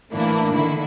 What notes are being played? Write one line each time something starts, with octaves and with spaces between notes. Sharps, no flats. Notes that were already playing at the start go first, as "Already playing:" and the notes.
A2 E3 A#3 D4 E4
D3 D#3 E4